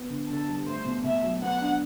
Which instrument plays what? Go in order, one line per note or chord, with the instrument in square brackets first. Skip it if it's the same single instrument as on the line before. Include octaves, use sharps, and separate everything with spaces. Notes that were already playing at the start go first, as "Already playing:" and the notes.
Already playing: [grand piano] B3
D3
[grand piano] D3 [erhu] A4
[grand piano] G3
[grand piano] A3 [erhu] C5
[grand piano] B2
[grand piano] B2 [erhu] E5
[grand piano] F#3
[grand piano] B3 [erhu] F#5
[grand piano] D4